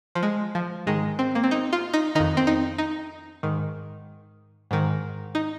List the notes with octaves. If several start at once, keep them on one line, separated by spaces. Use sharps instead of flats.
F3
G#3
F3
G#2 D#3 G#3
C4
A#3
C4
D#4
F4
D#4
F2 D#3 D#4
C4
D#4
D#4
G#2 D#3
G#2 D#3
D#4